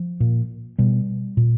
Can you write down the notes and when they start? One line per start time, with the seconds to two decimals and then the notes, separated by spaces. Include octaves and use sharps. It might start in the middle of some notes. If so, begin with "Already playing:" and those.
Already playing: F3
0.20 A#2
0.78 B2 G3
1.37 A#2